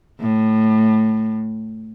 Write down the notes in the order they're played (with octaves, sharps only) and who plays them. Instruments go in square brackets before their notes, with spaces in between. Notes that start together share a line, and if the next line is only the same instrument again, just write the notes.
[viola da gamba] A2